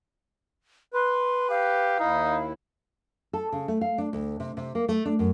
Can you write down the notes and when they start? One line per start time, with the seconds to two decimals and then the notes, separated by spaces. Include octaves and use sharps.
0.94 B4 C6
1.50 G4 F5
1.99 D#2 D#4 E4
3.33 A4
3.52 C#3
3.68 A3
3.81 F5
3.98 D4
4.13 D2
4.40 C3
4.57 C3
4.75 A#3
4.88 A3
5.05 D4
5.19 F#2